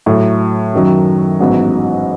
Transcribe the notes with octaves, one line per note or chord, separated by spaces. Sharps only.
A2 F#3 A3
F#2 D#3 F#3
A1 G#2 F#3 B3